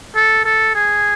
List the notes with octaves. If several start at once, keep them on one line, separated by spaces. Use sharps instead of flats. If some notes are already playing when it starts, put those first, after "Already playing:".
A4
A4
G#4